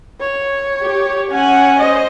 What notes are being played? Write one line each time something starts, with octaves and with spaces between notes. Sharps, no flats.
C#5
G4
C#4 F#5 G#5
C5 D#5